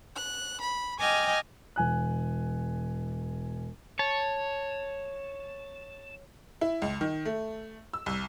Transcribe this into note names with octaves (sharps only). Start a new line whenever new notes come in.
F#6
B5
D#5 G5 G#5 D6 F6
E1 G#5 F#6
C#5 A5
E4
C#2
D#3
A3
E6
C2